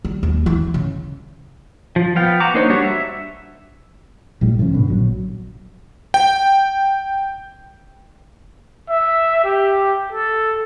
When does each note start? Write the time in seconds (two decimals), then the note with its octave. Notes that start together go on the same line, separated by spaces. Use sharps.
0.05 G3
0.23 D#2
0.46 E3
0.74 C#3
1.96 F3
2.16 F3 B3 F5 G5
2.40 F#4 A#5 D6
2.54 A#3 D4 D#4 C5 C#5
2.70 G3 D4 F#4 C#5
2.84 E5
4.41 A#1 A2 G3
4.59 A2 C#3 F3 C#4
4.73 G2 B2 D3
4.88 A#1 F#3
6.14 G5
8.90 E5
9.44 G4
10.12 A4